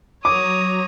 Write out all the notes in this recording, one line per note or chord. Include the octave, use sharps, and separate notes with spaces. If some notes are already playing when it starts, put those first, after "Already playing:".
F#3 C#5 A#5 D6 D#6